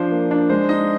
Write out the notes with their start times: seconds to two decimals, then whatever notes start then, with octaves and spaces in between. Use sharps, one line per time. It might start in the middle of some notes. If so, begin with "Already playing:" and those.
Already playing: F3 D4 C5
0.11 A#3
0.31 D4
0.49 G#3 C5
0.69 D#4 D#5